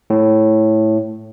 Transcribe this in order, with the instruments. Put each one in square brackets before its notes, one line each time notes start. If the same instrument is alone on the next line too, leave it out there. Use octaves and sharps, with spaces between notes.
[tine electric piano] A2